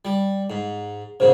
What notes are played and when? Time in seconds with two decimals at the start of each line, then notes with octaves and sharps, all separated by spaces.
0.05 G3
0.50 G#2
1.20 B1 G#2 C#3 A#4 C5